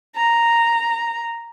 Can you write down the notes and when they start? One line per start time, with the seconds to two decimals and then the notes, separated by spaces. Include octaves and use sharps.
0.16 A#5